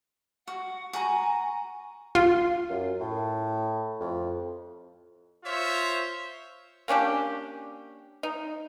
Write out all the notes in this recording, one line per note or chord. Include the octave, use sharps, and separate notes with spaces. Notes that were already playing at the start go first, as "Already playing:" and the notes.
F#4 F#5
F#4 G#5 A#5
F4
F#2
A2
F2
F4 C5 C#5 E5
A#3 C#4 D4 G4
D#4